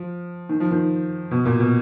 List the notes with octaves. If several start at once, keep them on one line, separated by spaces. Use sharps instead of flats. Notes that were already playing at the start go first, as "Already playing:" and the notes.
Already playing: F3
D#3
F3
D#3
B2
A#2
B2